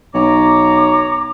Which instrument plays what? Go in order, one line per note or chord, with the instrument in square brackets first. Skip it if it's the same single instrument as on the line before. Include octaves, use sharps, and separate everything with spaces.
[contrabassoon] B1 [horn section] C#5 A#5 [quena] D6